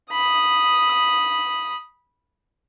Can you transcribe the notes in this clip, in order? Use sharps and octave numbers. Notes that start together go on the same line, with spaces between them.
B5 D#6